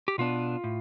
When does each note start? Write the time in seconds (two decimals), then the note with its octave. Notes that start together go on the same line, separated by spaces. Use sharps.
0.08 G4
0.18 B2 B3 D4 F4
0.64 A2